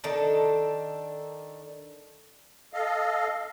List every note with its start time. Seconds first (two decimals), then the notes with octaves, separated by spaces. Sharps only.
0.04 D#3 D4 A4
2.74 A4 D#5 F5